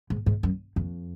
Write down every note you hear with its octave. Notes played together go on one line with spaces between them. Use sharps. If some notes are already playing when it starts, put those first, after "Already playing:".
G#2
G#2
F#2
F2